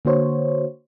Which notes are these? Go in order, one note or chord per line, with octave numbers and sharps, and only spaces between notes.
D3 A#3 F#4 C5 C#5